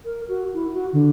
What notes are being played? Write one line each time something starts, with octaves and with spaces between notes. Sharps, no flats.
A#4
F#4
E4
F#4
D3